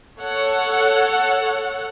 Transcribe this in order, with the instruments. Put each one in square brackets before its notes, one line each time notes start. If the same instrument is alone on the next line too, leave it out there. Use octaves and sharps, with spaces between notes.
[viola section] A4 C#5 F#5